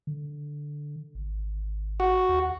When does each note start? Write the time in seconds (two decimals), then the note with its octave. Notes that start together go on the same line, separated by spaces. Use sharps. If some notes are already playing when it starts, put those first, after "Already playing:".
0.07 D3
1.15 G#1
2.00 F#4
2.29 D#2